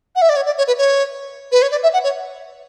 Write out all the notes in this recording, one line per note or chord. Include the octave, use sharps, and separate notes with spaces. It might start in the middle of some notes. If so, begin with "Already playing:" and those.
F#5
E5
D5
C#5
D5
C#5
B4
C#5
B4
C#5
D5
E5
F#5
C#5